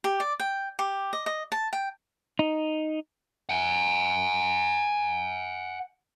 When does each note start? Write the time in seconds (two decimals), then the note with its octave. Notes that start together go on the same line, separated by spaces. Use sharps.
0.04 G4
0.20 D5
0.40 G5
0.79 G4
1.13 D#5
1.26 D#5
1.52 A5
1.73 G5
2.39 D#4
3.49 F#5 G#5